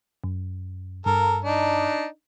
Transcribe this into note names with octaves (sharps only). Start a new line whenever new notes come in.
F#2
G2 A4 A#4
D4 D#4